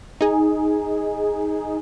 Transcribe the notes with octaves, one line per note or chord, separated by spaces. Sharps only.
D#4 G#4